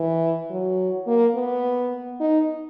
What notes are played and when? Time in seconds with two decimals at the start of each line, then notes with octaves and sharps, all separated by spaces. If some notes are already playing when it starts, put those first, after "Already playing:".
Already playing: E3
0.50 F#3
1.07 A#3
1.35 B3
2.20 D#4